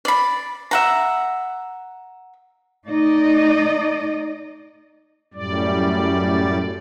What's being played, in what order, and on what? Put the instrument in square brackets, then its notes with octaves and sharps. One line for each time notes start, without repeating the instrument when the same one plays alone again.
[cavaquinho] D5 B5
E5 F#5 A#5
[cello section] A3 D#4 D5 D#5
[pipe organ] F#2 A2 G3 D5